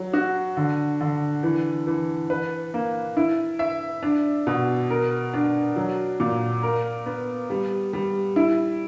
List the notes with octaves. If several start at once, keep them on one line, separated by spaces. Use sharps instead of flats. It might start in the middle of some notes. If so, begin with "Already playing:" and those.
Already playing: F#3
F#4
D3
D3
E3
E3
B4
A#3
E4
E5
D4
B2
A#4
D4
F#3
A#2
A#4
B3
G3
G3
E4